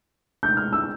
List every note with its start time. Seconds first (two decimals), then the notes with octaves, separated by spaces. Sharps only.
0.43 G6
0.57 F6
0.73 E6